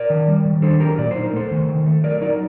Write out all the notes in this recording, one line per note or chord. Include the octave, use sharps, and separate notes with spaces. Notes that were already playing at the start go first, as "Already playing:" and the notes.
Already playing: A#4 D5
D#3
G3
D#3
D4 A4 C5
F#3 G4 A#4
A#2 D5
C5
D#4
A#4
A3 A4 C5
D#3
D#3
A3
F#3 A#4 D5
D#4 A#4 D5